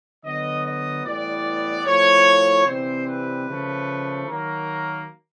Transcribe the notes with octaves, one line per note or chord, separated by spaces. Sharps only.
D3 F#3 B3 D#5
D#5
A2 E3 G3 B3 D5
A2 F3 A3 C#5
C3 E3 G3 C4 C5
B4
C#3 F3 A3
D#3 F#3 A#3 A#4